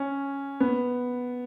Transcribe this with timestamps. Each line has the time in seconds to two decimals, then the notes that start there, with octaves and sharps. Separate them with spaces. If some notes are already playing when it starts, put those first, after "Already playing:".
Already playing: C#4
0.60 B3